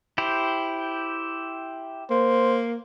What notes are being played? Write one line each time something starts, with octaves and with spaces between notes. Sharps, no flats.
E4 G4 C5
A#3 C5